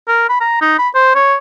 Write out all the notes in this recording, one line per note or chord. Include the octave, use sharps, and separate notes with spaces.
A#4
B5
A#5
D#4
B5
C5
C#5